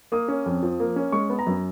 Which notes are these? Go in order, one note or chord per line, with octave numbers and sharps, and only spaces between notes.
A#3 D#6
C#4
F2
F3
A#3
C#4
G#3 C#6
B3
A#5
F#2